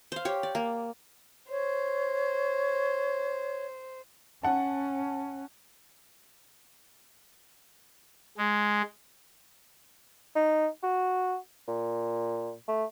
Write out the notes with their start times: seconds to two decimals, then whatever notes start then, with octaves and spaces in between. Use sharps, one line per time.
0.12 C5 F5
0.25 G4 C#5
0.43 D5
0.55 A#3
1.50 C5 C#5
4.43 C#4 F#5 A5
8.38 G#3
10.35 D#4
10.83 F#4
11.68 A#2
12.68 A3